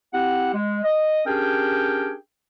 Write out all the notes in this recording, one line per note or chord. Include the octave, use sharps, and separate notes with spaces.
C4 E4 G4 F#5
G#3
D#5
C#4 D4 G4 G#4 A#4 G5